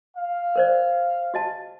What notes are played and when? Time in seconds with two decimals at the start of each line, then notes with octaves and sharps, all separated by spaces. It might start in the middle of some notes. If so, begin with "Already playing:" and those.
0.17 F5
0.56 A#4 C5 D5
1.34 F#4 D#5 A5